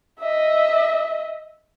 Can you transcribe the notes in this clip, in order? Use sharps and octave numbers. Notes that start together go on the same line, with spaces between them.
D#5 E5